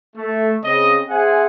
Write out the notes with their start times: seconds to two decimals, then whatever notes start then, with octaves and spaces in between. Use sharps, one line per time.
0.16 A3
0.64 C#3 C4 D#5
1.10 C4 G#4 C5 E5 F#5 G#5